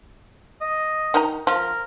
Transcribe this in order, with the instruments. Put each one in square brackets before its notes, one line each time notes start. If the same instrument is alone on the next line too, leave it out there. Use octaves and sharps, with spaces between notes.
[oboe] D#5
[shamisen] D#3 D#4 A#5
[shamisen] F3 [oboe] A#4